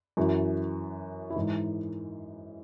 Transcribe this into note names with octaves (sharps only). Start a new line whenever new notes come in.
F#2 E3 F#4
E4
G#2 E3 D#4